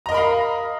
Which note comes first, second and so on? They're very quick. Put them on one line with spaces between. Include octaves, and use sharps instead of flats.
A#5 D#5 A#4 B5 F5